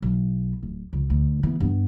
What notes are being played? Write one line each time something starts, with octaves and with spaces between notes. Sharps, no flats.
B1
D1
C#2
D2
E3 B3
G2 B3